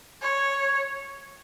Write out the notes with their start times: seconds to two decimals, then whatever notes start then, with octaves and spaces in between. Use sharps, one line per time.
0.22 C#5